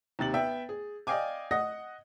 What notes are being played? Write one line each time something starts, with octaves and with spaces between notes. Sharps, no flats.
D#2 C3 A6 F#7
B3 E5 G5
G#4
D5 D#5 F5 G5 G#5 D6
D#5 F#5 D#6 A#6